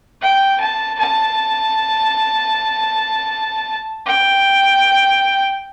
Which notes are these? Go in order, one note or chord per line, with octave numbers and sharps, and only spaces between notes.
G5
A5
A5
G5